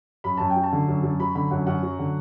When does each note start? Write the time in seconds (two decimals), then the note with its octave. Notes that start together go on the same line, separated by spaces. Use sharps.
0.24 F#2 B5
0.37 F#2 A5
0.50 G5
0.56 F#3
0.63 A5
0.72 D3
0.88 F#2
1.03 F#2
1.20 F#3 B5
1.35 D3 B5
1.51 F#2 F#5
1.67 F#2 F#5
1.83 F#3
1.99 D3